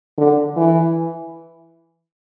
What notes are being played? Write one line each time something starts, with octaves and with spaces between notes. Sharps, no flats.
D3
E3